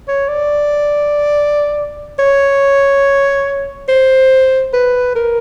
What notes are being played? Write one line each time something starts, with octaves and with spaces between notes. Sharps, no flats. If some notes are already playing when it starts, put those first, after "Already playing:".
C#5
D5
C#5
C5
B4
A#4